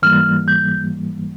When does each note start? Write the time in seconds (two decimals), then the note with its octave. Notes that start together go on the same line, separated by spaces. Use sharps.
0.02 G#2 E3 G3 A#3 F6
0.48 G6